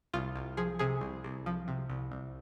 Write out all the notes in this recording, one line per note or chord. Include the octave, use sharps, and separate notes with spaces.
C2 F4
C2
F3 G#4
C3 G#4
C2
C2
F3
C3
C2
C2